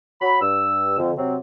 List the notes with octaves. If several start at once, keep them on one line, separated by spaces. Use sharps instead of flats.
F#3 B5
G2 E6
F2 D3
C3 F#3 C4